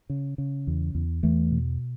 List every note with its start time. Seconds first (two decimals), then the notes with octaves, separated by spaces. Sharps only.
0.10 C#3
0.38 C#3
0.67 E2
0.95 E2
1.23 E2 E3 A3
1.51 B2